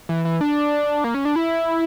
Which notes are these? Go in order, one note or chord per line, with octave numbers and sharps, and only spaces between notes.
E3
E3
D4
A#3
C#4
D4
E4